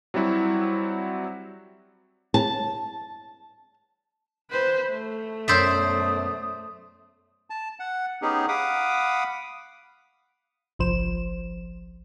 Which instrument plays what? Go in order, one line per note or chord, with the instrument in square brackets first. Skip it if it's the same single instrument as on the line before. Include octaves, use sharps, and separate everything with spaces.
[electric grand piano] F#3 G3 C4 E4 F#4
[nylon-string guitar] A5
[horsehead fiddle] B4 C5
A3
[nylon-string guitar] F#2 B2 [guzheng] C5 D5 E5 [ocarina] D#6
[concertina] A5
F#5
B3 C#4 D#4 G4 G#4
F5 F#5 B5 D6 D#6
[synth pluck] G1 C2 F3 C5 E7